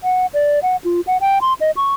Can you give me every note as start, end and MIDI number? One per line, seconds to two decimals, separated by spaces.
0.04 0.26 78
0.34 0.59 74
0.63 0.76 78
0.84 1.01 65
1.07 1.17 78
1.21 1.39 79
1.42 1.53 84
1.61 1.71 75
1.77 1.95 85